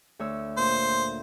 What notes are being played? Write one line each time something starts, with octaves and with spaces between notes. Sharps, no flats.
D2 C#5 E6
A#2 C5